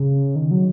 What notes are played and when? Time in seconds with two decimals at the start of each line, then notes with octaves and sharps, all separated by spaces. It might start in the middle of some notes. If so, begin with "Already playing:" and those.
Already playing: C#3
0.36 D#3
0.51 F#3